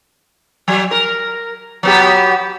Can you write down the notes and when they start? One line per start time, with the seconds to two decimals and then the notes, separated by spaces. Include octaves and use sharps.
0.68 F#3
0.91 A#4
1.83 F#3 B3 G4